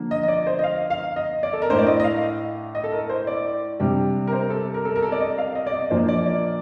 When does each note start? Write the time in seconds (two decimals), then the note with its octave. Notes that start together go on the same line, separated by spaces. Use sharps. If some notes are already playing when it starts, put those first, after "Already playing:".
Already playing: D3 F3 A#3
0.11 D#5
0.23 D#5
0.28 D5
0.47 C5
0.59 D#5
0.64 F5
0.90 F5
1.16 D#5
1.43 D5
1.53 A4
1.62 A#4
1.69 A2 A3 D4 C5
1.79 D5
1.87 D#5
2.00 D#5
2.04 F5
2.75 D#5
2.84 A4
2.92 A#4
3.10 C5
3.27 D5
3.80 C3 G3 D4
4.27 A#4
4.33 C5
4.50 A4
4.74 A#4
4.85 A4
4.96 A#4
5.03 A4
5.12 D5
5.20 D#5
5.38 F5
5.55 D#5
5.67 D5
5.73 D#5
5.90 A#2 F3 A#3 D4 C5
6.08 D5
6.26 D5